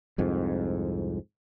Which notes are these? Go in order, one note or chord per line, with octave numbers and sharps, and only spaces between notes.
C2 F2 G#2